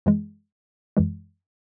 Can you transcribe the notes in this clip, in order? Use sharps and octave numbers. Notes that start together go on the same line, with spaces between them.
F#2 E3 G#3
F#2 E3 G#3